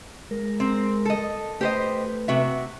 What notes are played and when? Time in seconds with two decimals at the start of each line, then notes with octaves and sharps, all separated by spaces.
0.31 G#3 A#4
0.60 C4
1.05 A4 D#5
1.61 A3 G4 B4 C5 D#5
2.28 C3 F#4 E5